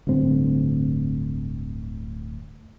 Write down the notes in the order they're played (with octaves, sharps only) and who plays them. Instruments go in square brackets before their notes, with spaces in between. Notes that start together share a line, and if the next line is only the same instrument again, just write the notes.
[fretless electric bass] D1 D2 G2 C4